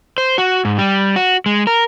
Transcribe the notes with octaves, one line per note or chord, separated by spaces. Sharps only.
C5
F#4
G#2
G3
F#4
G#3
A#4